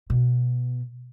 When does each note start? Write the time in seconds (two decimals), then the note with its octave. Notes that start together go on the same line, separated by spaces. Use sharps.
0.10 B2